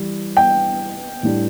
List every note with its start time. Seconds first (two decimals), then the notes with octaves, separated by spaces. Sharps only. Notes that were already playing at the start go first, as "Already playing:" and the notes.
Already playing: E3 G3 E4
0.37 G5
1.23 A2 G3 D4